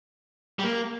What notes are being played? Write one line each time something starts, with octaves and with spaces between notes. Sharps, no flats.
G3
A#3